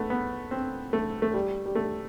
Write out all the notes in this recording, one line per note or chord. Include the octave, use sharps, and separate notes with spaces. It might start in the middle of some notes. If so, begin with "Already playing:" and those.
Already playing: A3 B3
B3
C4
A3
A3
G3
G3
A3